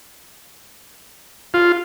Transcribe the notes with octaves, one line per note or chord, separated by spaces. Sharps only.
F4